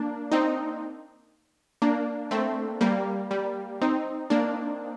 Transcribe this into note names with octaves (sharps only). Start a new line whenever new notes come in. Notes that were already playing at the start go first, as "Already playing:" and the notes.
Already playing: A#3 D4
C4 D#4
A#3 D4
A3 C4
G3 A#3
G3
C4 D#4
A#3 D4